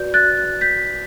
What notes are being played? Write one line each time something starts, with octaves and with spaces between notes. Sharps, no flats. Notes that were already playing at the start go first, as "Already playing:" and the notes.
Already playing: F#4 B4 D5 G6
F#6 A6
G6 B6